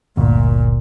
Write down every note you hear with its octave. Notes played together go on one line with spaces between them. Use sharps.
G1 D2 A#2